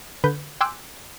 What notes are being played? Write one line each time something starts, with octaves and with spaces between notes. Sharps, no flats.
D3 B4 G6
G5 G#5 C6 D6 E6 F#6